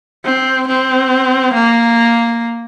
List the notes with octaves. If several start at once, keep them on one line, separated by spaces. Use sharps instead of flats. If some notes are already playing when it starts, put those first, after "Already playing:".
C4
C4
A#3